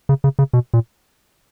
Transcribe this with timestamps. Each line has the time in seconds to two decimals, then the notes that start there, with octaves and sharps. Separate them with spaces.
0.09 C#3
0.24 C#3
0.39 C#3
0.53 B2
0.74 A#2